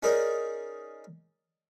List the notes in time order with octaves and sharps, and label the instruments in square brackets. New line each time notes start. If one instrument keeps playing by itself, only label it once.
[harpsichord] C#4 D#4 G#4 A#4 D5 D#5